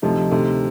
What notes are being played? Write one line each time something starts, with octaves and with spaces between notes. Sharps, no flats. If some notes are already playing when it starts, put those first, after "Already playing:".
D2 C3 F3 D#4
D2 C3 D#3